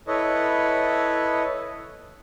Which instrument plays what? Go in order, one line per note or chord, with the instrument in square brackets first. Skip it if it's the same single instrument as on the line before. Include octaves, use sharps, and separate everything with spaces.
[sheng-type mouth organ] E4 A4 B4 C#5 D#5